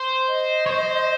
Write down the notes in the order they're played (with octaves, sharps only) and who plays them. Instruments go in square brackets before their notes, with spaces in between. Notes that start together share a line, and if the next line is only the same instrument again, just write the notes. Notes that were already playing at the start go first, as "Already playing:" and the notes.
Already playing: [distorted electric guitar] C5
[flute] D#5
[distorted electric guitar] C#5
C5